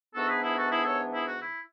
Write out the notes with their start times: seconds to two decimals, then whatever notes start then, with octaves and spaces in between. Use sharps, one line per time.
0.14 G#2 E3 B3 D4 F#4 A4
0.28 G#4 B4
0.42 E4 G#4
0.57 F#4 A4
0.70 E4 G#4
0.84 A4 C#5
1.12 E4 G#4
1.26 F#4
1.40 E4